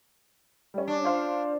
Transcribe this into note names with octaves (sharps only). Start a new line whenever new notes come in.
G3 C#4
D4
F4 C5 F5